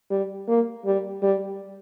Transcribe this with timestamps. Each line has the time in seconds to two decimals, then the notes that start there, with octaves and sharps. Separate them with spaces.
0.11 G3
0.48 A#3
0.85 G3
1.22 G3